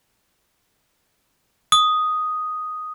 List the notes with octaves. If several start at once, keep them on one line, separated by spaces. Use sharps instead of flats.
D#6